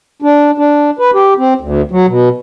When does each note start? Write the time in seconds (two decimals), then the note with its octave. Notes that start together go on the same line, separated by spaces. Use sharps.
0.22 D4
0.58 D4
0.99 B4
1.14 G4
1.38 C4
1.61 D2
1.91 F#3
2.07 B2